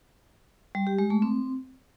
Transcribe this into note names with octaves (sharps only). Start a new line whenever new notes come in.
G3
G4
G#3
A3
C4